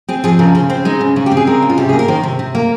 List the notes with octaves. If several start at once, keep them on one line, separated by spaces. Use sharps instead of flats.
C4 G#4
F3 G#4
C#3 A#4
C#3 C5
C4 C5
G#3 D#4
C#3
C#3 D#4
G4
C4
G#4
G#3 A#4
C#3
F4
C3 G4
A#3 G#4
A#4
D#3 C5
C3
C3
A#3